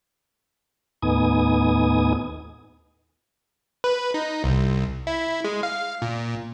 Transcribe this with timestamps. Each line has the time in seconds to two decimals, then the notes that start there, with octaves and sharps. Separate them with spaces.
1.02 D#2 A2 B3 D#4 G#5 D#6
3.84 B4
4.14 D#4
4.44 C2
5.07 E4
5.44 G#3
5.63 F5
6.02 A#2